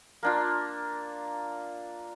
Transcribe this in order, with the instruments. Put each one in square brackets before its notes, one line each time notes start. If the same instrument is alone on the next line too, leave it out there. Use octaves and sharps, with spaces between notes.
[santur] A#3 D4 F4